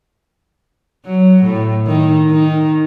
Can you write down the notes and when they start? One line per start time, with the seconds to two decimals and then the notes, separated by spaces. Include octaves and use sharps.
1.05 F#3
1.43 A2
1.87 D#3
2.31 D#3